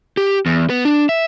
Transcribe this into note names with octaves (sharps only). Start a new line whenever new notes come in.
G4
E2
B3
D4
E5